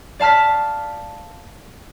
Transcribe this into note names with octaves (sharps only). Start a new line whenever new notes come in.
D5 F5 A5 F6 B6